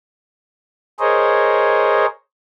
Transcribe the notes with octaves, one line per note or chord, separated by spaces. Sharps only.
G#4 A#4 C5 C#5 D#5